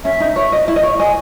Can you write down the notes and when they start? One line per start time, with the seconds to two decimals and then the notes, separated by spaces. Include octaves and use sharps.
0.04 C#4 E5
0.20 D#4
0.36 C#5
0.52 D#5
0.68 E4
0.76 D#5
0.83 C#5
0.99 D#5 G#5